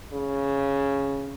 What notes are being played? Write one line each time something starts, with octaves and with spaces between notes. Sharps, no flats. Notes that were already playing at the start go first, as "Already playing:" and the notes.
C#3